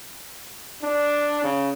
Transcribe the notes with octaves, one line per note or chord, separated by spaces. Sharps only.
D4
C#3